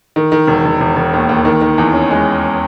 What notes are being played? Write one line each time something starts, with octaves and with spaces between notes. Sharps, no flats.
D#3
D#3
E1
E1
E1
E1
D#2
D#2
D#3
D#3
E2
C#4
G#3